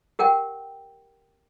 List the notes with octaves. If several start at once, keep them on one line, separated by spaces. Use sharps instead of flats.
G4 A#4 F#5 G5